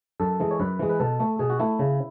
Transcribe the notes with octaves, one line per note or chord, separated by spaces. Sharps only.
F#2 A4
E3 G#3
C#5
F#2 B4
E3 G#3
B4
B2 A4
A3
B2 G#4
F#4
A3 E4
C#3